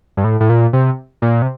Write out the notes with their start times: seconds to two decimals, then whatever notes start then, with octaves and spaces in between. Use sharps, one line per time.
0.17 G2
0.24 A2
0.40 A2
0.49 A#2
0.73 C3
1.22 A#2
1.42 C3